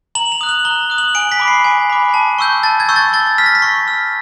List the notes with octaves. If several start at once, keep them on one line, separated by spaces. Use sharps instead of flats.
A#5 F#7
F7
D#6 F#6
F#7
A#5 G7
D#6 F#6
F#7
G#5 D7
B6
B5 D6
C7
G#5
B5 D6
A5
C#6 E6 G6
A5 A6
G#6
C#6 E6 G6
A6
C#6 A6
F6 B6
A#6
B6
C#6
F6